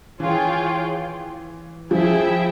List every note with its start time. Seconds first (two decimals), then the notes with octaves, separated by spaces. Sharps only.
0.20 E3 F4 G#4 C#5 G5
1.91 F3 E4 G#4 E5 G5